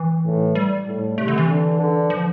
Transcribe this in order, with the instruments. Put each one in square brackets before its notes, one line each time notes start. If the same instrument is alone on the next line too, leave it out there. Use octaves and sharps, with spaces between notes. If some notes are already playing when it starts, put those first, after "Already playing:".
Already playing: [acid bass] E3
[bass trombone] A2
[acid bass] G3
[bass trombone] A2
[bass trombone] C3 [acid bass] A3
[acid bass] D3
E3
[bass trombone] D3
D3
[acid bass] F3